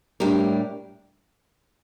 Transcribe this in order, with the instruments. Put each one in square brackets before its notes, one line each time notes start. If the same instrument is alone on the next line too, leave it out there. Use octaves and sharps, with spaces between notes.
[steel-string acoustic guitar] A2 G3 D4 G4 A#4